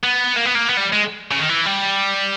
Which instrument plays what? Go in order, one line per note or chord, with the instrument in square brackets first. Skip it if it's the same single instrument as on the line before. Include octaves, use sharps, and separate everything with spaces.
[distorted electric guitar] B3
A#3
B3
A#3
B3
G3
G#3
C#3
D#3
E3
G3